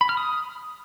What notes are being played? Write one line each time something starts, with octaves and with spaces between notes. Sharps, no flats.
B5
F6
D#6